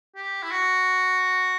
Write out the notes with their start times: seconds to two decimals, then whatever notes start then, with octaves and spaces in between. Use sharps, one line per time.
0.16 G4
0.43 E4
0.51 F#4